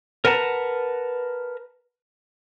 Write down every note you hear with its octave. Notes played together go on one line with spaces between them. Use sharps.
A#4 B4 F#5 A5 A#5